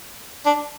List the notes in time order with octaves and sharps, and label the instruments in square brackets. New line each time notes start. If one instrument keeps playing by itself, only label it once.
[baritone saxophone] D4